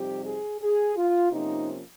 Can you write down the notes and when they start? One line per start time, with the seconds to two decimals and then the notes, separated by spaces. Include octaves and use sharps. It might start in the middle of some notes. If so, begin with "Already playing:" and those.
Already playing: F2 C3 G3 C4 D#4 G4
0.25 G#4
0.60 G#4
0.96 F4
1.31 C3 F3 A#3 C#4 D#4